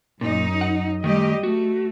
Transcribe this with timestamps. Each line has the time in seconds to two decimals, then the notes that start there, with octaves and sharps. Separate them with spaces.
0.21 F#2 A#2 D#4
0.61 F#5
1.04 D#3 G3 A3 G4 D#5
1.43 A3 F#4